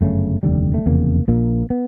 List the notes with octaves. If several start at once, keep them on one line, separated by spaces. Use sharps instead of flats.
G1 F#2 C#3 A3
F1 D#2 D3 G3
A3
F1 E2 C#3 A#3
A#1 A#2 A#3
B3